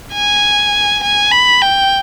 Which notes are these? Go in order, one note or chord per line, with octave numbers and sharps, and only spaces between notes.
G#5
G#5
B5
G5